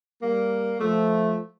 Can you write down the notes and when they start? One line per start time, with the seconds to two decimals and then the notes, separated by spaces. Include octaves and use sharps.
0.22 G3 A#3
0.80 F3 A3